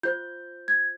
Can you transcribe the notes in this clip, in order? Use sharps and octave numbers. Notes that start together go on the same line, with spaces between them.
F4 C5 G6
G#6